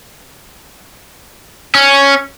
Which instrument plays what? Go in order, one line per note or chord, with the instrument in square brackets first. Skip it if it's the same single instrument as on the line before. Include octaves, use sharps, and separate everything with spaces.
[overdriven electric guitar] C#4